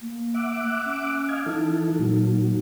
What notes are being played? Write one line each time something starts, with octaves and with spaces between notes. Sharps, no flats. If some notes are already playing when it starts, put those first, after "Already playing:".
A#3
E5 F#5 D6
C#4
D#5 F5 G#5
E3 D#4 A4
A#2 F#3